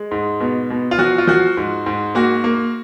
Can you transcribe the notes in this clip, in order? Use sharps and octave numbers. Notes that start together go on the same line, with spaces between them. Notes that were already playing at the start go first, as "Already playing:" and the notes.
Already playing: G#3
G#2
B2
B2
F4
F3 F#4
F4
F3 F#4
G#2
G#2
A#3 F#4
A#3